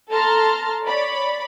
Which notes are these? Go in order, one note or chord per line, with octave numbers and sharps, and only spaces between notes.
A4 A5 A#5 C6 F6
C#5 D5 B5